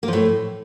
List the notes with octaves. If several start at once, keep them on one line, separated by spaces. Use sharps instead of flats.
A#3
F3
A2